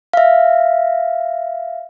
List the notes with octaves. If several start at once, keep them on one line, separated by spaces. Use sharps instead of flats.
E5 F5